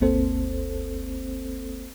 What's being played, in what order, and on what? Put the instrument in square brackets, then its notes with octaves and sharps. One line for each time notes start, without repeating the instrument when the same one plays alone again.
[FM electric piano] G1 D2 A#3 C4 A4 C5